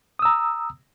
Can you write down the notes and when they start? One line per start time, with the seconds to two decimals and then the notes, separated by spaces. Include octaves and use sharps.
0.19 D#6
0.22 E6
0.25 A#5